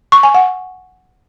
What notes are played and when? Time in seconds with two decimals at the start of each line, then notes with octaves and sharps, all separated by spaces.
0.12 C#6
0.23 G#5
0.35 F#5